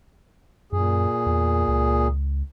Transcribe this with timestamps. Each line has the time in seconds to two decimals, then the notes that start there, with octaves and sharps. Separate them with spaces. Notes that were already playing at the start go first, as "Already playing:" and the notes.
0.72 F#2 A#2 G#4
1.26 E2
1.68 C#2